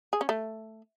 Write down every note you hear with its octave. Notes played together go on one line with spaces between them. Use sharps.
G#4
C#4
A3